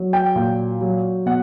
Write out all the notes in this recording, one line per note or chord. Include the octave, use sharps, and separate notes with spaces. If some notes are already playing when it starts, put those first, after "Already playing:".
Already playing: F#3
G5
A#2
F#3
B2 F#5